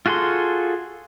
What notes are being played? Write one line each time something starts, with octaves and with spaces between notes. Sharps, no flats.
F4 F#4 G#4 A4 C6